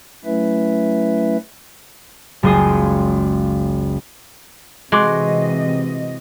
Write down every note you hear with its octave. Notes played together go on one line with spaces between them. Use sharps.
F#3 A3 C#4 E4 B4 E5
F#1 C#2 G#4 C6 C#6 D#6
C3 E3 G#3 F#4 D#5 C6 D6